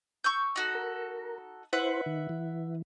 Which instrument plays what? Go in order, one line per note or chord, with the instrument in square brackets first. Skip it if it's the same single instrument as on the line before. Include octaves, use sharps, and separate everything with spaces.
[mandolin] C#6 E6 G6
D#4 F#4 A4
[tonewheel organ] A#4
[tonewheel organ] E4 C5 [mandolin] B4 E5 F#5
[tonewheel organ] D#3
E3